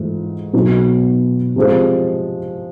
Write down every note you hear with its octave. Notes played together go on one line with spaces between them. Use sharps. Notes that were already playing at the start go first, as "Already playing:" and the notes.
Already playing: G#2 E3 A3 F4
B2 F#3 B3 D#4 F#4
C3 F3 G#3